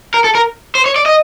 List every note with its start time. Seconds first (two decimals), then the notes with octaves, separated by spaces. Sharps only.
0.14 A#4
0.24 A4
0.35 A#4
0.75 C5
0.86 C#5
0.96 D5
1.06 D#5